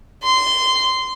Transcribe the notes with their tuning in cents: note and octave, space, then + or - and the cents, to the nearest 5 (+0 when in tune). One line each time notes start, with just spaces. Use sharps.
C6 -15